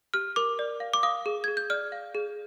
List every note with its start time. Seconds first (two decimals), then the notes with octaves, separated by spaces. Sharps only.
0.14 G4 F6
0.36 A#4 D6
0.59 D5
0.80 F5
0.94 D6
1.03 F5 D#6
1.26 G#4
1.44 G#4 G#6
1.57 G6
1.70 D5 F6
1.92 F5
2.15 G#4